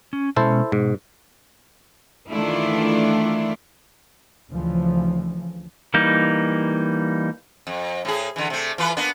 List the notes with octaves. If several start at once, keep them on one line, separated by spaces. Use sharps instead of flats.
C#4
B2 G#3 C#4 E4 A4 C5
G#2 B2
D#3 E3 A3 D4 E4 F4
D2 C#3 E3 F3
E3 G3 A#3 D#4
F2
A2 G#4
D3 E3
C3 A3
E3 F4 B4
A#3 B3 D4